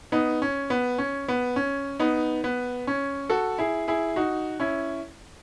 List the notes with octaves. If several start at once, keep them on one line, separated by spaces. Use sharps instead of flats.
B3 D#4
C#4
B3
C#4
B3
C#4
B3 D#4
B3
C#4
F#4 A4
E4 G#4
E4 G#4
D#4 F#4
C#4 E4